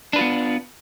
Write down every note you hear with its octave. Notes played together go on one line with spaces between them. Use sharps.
B3 D4 F4 B4